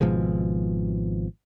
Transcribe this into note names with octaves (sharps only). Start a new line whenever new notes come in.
G#1 B2 F3 G#3